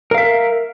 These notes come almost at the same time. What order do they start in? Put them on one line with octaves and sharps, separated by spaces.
A#4 F5 E5